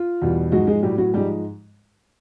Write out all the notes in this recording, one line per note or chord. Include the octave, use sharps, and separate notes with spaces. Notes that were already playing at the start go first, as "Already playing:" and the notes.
Already playing: F4
E2 B2 G3
G#2 F3 F#3 G#3 F#4
G#3 G#4
A2 F#3 G3 G4
F#3 F#4
G#2 F3 G3 G#3 G4